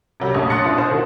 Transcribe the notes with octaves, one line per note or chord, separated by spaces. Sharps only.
C3 F#3 G3
A#1 F2 A3 C#5 D#6
C6 D#6 F#6 A6 A#6 C#7
B2 D4 E4 F4
C5 C#5
D#3 F#4